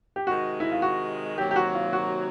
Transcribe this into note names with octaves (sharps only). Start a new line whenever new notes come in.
G4
C3 D#3 G#3 F#4
E4
F4
F#4
C3 D#3 F#3 A#3 G4
G4
F#4
F4
F#4